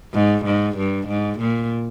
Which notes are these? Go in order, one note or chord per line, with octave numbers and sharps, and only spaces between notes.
G#2
G#2
G2
G#2
A#2